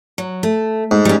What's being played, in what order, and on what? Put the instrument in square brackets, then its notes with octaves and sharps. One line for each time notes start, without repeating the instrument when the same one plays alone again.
[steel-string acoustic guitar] F#3
A3
[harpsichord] G#2
[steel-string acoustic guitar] G3 C#4